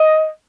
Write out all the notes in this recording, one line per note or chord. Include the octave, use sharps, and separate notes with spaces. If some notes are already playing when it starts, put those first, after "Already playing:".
Already playing: D#5